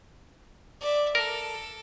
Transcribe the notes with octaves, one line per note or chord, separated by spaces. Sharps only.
D5 E5
A4 A#4